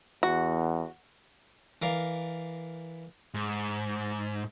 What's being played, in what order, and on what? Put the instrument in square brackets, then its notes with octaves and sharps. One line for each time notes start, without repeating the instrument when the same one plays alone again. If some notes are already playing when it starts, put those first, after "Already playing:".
[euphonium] E2 [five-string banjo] F#4
[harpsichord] E3 A#4 D5 F5
[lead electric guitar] G#2